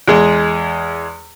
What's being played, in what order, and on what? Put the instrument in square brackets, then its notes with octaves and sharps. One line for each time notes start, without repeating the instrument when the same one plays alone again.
[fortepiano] E2 G#3 G#4